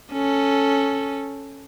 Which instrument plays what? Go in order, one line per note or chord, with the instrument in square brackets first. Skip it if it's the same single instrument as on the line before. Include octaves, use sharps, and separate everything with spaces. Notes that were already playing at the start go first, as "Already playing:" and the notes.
[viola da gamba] C#4 A4